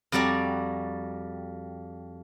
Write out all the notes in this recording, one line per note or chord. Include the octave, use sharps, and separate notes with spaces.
F2 G3 F#4 D5 A#5